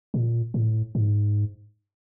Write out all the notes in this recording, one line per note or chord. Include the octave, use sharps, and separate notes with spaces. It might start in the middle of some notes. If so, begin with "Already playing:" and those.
A#2
A2
G#2